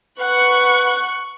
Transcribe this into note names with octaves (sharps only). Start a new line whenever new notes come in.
B4 F#5 C#6 F#6